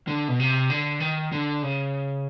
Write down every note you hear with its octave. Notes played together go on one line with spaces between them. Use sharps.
D3
B2
C3
D3
D#3
D3
C#3